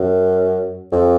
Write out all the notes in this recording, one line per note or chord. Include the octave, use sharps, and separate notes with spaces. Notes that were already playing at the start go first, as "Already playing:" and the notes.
Already playing: F#2
F2